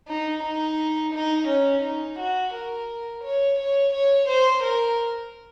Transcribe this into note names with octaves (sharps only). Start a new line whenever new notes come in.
D#4
D#4
D#4
C#4
D#4
F#4
A#4
C#5
C#5
C#5
C5
A#4